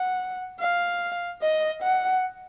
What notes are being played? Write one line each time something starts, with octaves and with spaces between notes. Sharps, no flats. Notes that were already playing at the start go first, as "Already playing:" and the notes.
Already playing: F#5
F5
D#5
F#5